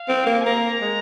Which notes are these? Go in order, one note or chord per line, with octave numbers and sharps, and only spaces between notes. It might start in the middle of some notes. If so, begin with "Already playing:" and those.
Already playing: F5
C4
A#3
G#5
A#3 A#5
G#3